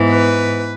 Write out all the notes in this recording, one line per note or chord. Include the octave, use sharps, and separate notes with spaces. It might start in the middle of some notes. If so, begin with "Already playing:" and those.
Already playing: G#2 E3 B3
B4